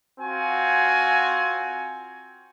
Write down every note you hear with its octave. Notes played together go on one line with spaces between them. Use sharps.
C4 F4 F#4 G#5